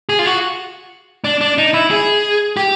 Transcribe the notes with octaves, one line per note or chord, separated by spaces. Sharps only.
G#4
F4
F#4
D4
D4
D#4
E4
G#4
G4